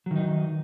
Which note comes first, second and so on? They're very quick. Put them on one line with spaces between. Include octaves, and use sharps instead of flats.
F#3 D#3 D#4